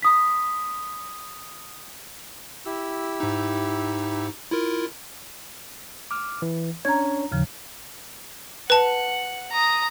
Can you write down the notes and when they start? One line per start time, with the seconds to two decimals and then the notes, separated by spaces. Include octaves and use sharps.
0.02 B5 D#6 B6
2.66 E4 G4 E6
3.20 G#2 D#4
4.51 E4 F4 A#4
6.11 D6 F6
6.42 E3
6.85 C#4 D4 C#5 A#5 G#6
7.32 G#1 D#2 C#3 F3
8.70 B4 F#5 A5
9.53 A#5 D#6